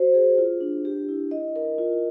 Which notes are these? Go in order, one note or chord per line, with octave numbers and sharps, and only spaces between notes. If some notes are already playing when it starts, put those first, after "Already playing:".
Already playing: F#4 C5
G#4
F4
D4
G4
E4
D#5
A#4
F4